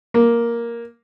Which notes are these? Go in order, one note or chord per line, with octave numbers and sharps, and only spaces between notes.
A#3